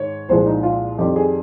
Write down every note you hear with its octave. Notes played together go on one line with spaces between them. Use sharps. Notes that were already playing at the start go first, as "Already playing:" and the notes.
Already playing: G#2 D#3 C#5
C2 A#2 F3 G#3 C5
D#4
F4
F2 D#3 G3 G4
G#4